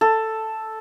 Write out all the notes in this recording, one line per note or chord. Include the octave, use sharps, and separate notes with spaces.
A4